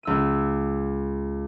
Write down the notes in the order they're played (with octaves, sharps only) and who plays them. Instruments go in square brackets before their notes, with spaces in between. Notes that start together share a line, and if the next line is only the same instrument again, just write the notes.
[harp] C#2 E6 D#7